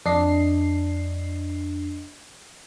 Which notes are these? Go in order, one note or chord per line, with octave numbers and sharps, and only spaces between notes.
F2 D4 D#5 C7